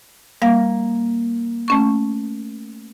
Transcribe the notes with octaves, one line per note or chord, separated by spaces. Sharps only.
G3 A#3 F5 A#6
A3 C#4 C#6